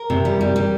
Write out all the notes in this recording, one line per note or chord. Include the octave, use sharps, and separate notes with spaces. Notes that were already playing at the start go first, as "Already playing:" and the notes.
Already playing: A#4
C3
G3
G3
G3